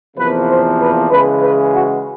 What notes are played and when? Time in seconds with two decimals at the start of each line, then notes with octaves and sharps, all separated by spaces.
0.17 E2 C3 F3 A#3 B4
0.49 C5
0.80 B4
1.11 C#3 E3 G#3 B4
1.42 B4
1.74 F#4